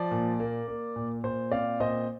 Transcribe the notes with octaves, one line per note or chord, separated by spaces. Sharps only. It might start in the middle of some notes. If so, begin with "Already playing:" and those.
Already playing: F3 D5
A#2
A#3
A#3
A#2
A#2 C5
C4 D5 F5
A#2 C5 D#5